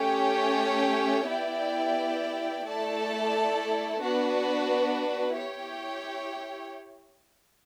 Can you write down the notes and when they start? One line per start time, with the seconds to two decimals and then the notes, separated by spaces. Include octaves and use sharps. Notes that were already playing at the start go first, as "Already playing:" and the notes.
Already playing: A3 C#4 G4 C#5 G5
1.28 B3 E4 G4 D5 G5
2.65 A3 E4 A4 D5 A5
4.01 B3 D4 F#4 B4
5.37 E4 G4 C#5 G5